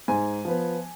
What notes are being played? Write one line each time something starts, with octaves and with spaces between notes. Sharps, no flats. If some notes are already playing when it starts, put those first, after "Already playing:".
G#2 G#5
F3 B3